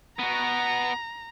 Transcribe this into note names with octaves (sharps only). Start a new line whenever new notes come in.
B3 F#4 A#5